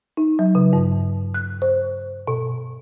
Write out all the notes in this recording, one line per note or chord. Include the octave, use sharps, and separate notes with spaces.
D#4
F#3
C#3
G2
F#6
C5
B2